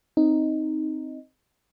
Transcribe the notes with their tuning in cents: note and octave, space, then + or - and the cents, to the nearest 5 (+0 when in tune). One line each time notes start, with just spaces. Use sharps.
C4 +0 D#4 +0